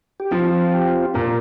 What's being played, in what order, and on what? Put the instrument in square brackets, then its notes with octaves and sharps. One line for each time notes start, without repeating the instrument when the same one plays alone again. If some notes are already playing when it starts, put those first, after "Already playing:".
[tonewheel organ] G4
[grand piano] F3 [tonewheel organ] C4 F4
[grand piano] G4
[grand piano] A#2 [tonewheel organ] A#3